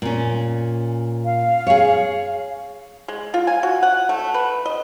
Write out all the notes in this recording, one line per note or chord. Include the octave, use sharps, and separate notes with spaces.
A#2 C#4
F5
G#4 C#5
G#3
F4
G#5
F#4
F#5
A3
B4
D#5